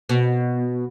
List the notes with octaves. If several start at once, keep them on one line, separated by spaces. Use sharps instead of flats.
B2